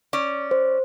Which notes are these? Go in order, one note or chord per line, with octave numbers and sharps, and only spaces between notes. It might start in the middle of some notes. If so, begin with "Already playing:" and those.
C#4 D5
C5